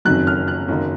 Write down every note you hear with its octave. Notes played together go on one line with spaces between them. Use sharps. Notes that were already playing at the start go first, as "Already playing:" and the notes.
F#1 F2 D#3 F#3 F#6
F6
F#6
F#1 F#2 D#3 A#3